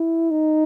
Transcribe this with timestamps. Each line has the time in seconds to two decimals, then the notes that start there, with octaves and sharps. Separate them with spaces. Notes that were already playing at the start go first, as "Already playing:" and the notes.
Already playing: E4
0.31 D#4